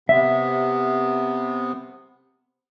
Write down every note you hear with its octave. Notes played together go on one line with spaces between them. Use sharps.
C3 B3 E5